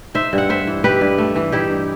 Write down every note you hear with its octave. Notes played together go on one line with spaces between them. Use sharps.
D#4 C5 E5
G2
F#5
A3 C5 E5
E3
D#4 G4 B4
G2
A3
E3
D#4 E4 G4
G2